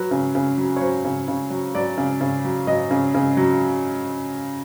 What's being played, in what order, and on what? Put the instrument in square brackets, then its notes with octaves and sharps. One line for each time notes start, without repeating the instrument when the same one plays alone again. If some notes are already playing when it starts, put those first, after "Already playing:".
Already playing: [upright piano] F#3 B4
C#3
C#3
F#3
C#5
F#3 C5
C#3
C#3
F#3
F#3 D5
C#3
C#3
F#3
F#3 D#5
C#3
C#3
F#3